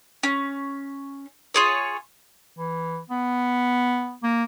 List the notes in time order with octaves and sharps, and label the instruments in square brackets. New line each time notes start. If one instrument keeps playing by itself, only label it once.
[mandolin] C#4
F4 G#4 C#5
[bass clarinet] E3
B3
A#3